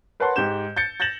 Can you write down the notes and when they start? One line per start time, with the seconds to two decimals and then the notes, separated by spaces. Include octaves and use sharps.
0.20 A#4 B4 C#5 F#5 A5 C6
0.36 G#2 G4 G6 E7
0.76 G6 A6 C#7
1.00 G6 A6 A#6 E7 F#7